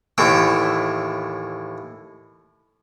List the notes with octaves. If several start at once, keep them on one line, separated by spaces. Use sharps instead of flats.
D#2 A2 E3 E4 G5